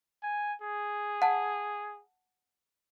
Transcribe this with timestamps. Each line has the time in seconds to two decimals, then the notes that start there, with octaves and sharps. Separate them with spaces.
0.23 G#5
0.62 G#4
1.22 F#5 A5